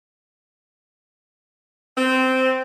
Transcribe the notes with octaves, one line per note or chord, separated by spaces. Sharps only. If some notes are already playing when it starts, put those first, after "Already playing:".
C4